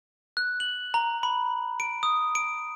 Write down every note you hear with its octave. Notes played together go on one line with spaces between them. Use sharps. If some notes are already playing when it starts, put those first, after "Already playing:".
F#6
F#7
A#5
B5
D7
D#6
D7